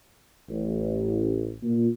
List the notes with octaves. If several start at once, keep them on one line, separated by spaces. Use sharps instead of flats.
A1
A#2